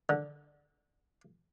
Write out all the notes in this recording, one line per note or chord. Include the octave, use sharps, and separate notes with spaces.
D3